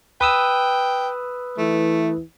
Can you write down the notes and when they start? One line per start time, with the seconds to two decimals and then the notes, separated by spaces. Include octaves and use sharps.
0.21 B4 G5 D#6 E6
1.58 E3 A3